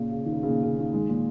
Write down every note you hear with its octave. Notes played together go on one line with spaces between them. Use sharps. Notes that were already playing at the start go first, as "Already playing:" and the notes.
Already playing: A#2 C#3
C#3
D#3
C#3
C#3
A#2
C#3
A#2 D#3
D#3 G#3
A#2 D#3